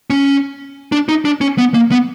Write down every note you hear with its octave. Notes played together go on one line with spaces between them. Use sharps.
C#4
D4
D#4
D4
C#4
B3
A#3
B3